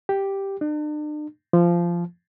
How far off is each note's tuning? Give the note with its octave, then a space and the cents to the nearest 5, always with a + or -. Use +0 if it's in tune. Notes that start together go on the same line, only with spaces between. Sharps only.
G4 +0
D4 +45
F3 -15